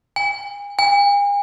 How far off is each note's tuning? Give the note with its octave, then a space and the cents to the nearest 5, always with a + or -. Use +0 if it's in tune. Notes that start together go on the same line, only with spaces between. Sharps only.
G#5 -40
G#5 -45